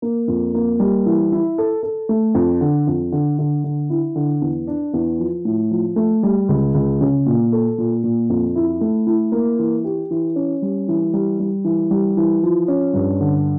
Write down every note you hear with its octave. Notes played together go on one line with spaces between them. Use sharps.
A#3
F2
A#3
G3
E3
E4
A4
A4
A3
F2
D3
F2
D3
D3
D3
E4
D3
E2
D4
E2
F3
A2
F3
A3
G3
C#2
C#2
C#3
A#2
A4
A#2
A#2
F2
E4
A3
E4
A#3
E3
G4
E3
C#4
G3
E3
G3
G3
E3
G3
E3
F3
C#4
G2
D3